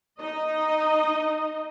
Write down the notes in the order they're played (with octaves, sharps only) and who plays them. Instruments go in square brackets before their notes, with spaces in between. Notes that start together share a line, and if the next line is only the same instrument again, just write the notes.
[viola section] D#4 D#5